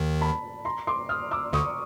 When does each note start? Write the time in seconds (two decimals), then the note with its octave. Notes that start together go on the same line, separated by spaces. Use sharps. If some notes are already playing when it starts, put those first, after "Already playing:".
Already playing: D#2 D#3
0.21 A5 B5
0.65 A#5 C6
0.87 C6 D6
1.09 D#6 F6
1.31 D6 E6
1.53 D2 D3 C#6 D#6